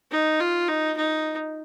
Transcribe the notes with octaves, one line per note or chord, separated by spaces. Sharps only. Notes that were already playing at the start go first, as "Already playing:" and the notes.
D#4
F4
D#4
D#4